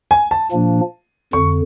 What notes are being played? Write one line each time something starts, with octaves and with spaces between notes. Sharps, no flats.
G#5
A5
A#2 F3 A#3 D4
F2 D3 C#6